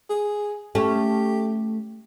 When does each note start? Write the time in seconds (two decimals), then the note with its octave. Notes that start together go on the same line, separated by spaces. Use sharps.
0.10 G#4
0.75 A3 C#4 G4